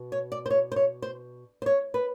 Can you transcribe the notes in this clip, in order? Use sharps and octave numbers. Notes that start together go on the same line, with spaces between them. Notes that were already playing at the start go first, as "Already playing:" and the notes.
Already playing: B2
C#5
D5
C5
C#5
C5
C#5
C5
C5
C#5
B4